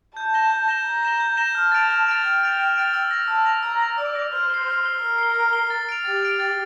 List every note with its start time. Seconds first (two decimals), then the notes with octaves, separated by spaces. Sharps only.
0.16 A5 G6
0.34 A#6 E7 G7
0.50 G6
0.68 A#6 E7 G7
0.86 A#5 G6
1.03 A#6 E7 G7
1.20 G6
1.37 A#6 E7 G7
1.55 A5 F6
1.72 A6 D7 F7
1.90 F6
2.07 A6 D7 F7
2.24 G5 F6
2.41 A6 D7 F7
2.59 F6
2.76 A6 D7 F7
2.94 E6
3.11 A#6 F7
3.28 A5 E6
3.45 A#6 F7
3.63 A#5 E6
3.80 A#6 F7
3.98 D5 E6
4.15 A#6 F7
4.32 C5 F6
4.50 C7 G7
4.67 F6
4.84 C7 G7
5.01 A#4 F6
5.18 C7 G7
5.36 F6
5.53 C7 G7
5.70 A6
5.89 D7 F7
6.05 G4 A6
6.23 D7 F7
6.40 A6